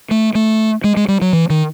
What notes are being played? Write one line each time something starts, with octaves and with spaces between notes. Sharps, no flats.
A3
A3
G#3
G#3
G3
F#3
E3
D#3